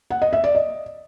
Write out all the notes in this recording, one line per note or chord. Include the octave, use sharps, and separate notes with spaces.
F#5
D#5
E5
D5
D#5